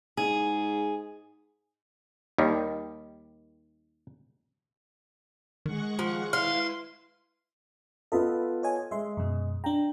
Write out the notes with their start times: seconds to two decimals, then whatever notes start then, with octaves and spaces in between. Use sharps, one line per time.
0.17 G#2 G#4
2.38 D#2 D#3 G3
5.66 D#3 G#3 F#5 C#6
5.99 F3
6.33 E4 B4 F5 C6
8.12 B3 F4 A4 D#5 E5 B5
8.63 C#5 D#5 G#5
8.91 G#3 E5 C6
9.17 F#2 B2
9.64 D4 G5 A#5